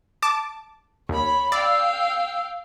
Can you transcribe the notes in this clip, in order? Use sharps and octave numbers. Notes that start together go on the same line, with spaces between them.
A5 D6
D#2 C#5 B5
D5 F5 G5 E6